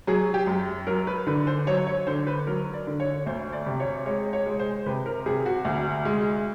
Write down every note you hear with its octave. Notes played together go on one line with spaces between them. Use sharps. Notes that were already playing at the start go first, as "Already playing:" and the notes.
F#3 G#4
G4
F#2
F#3 A#4
B4
D3 B4
C5
F#3 C#5
C#5
D3 C5
B4
F#3 A#4
D5
D3
C#5
D2 C5
D5
C3
C#5
G#3 C#5
C#5
G#3
C5
C3 B4
A#4
C3 G#4
F#4
D2
G#3